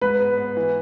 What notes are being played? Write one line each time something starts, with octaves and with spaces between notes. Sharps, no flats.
G#2 B4
B3
B3
E3